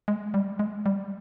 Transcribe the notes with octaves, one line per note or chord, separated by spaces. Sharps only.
G#3
G3
G#3
G3